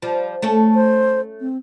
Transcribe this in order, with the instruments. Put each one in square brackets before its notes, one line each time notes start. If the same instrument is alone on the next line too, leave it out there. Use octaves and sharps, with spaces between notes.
[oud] F3 G3
A3 C#4 A4
[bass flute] C5
C4